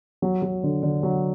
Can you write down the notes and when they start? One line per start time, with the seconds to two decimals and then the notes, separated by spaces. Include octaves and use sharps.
0.22 F#3
0.42 F#3
0.63 D3
0.83 D3
1.03 F#3